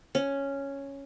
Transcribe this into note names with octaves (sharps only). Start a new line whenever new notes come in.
C#4